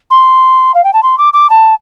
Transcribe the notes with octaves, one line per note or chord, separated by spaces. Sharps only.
C6
F5
G5
A5
C6
D6
D6
A5